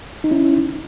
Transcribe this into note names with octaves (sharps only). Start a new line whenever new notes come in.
D#4
C#4 E4